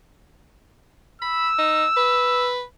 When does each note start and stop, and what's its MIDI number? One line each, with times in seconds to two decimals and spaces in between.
1.22 1.49 83
1.22 2.50 88
1.59 1.85 63
1.97 2.62 71